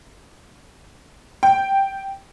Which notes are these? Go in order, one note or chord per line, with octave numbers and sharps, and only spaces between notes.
G5